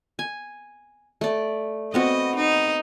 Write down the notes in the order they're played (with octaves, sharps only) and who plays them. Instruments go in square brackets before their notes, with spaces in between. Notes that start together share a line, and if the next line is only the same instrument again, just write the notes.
[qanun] G#5
A3 D5
[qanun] B3 C4 F#4 [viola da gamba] D#5
[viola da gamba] D#4